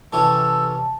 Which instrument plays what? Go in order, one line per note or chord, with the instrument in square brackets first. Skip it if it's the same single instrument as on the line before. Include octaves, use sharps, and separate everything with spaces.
[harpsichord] C3 E3 C#4 [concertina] A4 [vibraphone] A5